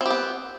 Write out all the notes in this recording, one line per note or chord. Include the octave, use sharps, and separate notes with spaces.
B3 C4 G4